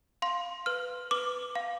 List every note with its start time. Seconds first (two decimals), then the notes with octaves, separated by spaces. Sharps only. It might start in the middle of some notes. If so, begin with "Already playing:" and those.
0.22 F5 C6
0.66 B4 F6
1.11 B4 D6
1.55 F5